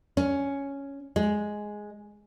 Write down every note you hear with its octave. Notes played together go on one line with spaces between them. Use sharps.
C#4
G#3